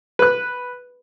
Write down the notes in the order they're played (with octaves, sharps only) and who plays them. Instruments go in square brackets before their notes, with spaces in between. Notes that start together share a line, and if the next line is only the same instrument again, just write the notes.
[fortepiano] B4 F#6